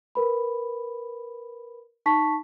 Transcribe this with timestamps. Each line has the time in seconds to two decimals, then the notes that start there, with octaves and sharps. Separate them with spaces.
0.15 A#4 B4 B5
2.06 D#4 A5 C#6 B6